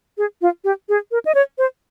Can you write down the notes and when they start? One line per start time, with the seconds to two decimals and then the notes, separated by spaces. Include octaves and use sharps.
0.18 G#4
0.42 F4
0.64 G4
0.89 G#4
1.11 A#4
1.25 D#5
1.35 C#5
1.58 C5